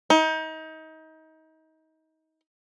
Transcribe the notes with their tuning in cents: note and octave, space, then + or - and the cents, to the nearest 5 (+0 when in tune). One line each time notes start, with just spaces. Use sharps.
D#4 +30